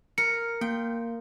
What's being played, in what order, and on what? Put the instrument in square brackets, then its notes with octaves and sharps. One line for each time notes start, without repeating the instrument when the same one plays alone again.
[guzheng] A#4 [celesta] C#7
[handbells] A#3 [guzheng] G5